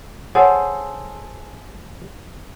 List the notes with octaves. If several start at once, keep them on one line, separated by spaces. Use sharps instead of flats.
G#4 A4 C5 C#5 F#5